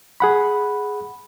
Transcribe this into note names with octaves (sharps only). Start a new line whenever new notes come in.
G#4 F#5 B5